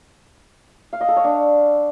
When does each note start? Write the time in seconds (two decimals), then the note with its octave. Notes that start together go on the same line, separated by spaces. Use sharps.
0.93 F5
1.01 D#5
1.08 A4
1.16 C#5
1.24 D4